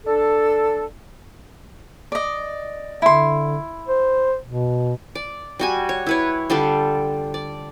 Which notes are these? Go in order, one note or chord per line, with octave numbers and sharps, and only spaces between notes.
D4 A4
D5 D#5
D3 E4 C6
C5
B2
D5
G3 F#4 G#5
C#5
E4 B4 C#5
D3 G3 F4 A4
D5